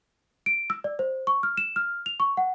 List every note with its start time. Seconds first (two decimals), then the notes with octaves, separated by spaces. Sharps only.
0.46 D7
0.70 E6
0.84 D5
0.99 C5
1.27 C#6
1.43 F6
1.57 E7
1.76 F6
2.06 F7
2.20 C#6
2.37 F#5